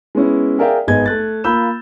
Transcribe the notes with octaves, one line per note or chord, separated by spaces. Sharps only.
G#3 B3 C#4 E4
G#4 A#4 D5 E5 F5 G5
G#1 B3 G#4 D#5 G#6
A3 F#6 A6
A#3 F4 B5 E6 G6 E7